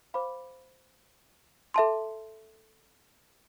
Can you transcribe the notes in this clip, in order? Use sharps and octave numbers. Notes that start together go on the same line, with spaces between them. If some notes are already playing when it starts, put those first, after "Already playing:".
C5 F5 B5 D6
A4 E5 A5 C6